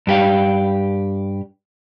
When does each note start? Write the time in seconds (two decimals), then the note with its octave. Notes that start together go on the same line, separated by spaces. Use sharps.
0.07 G2 G4 F5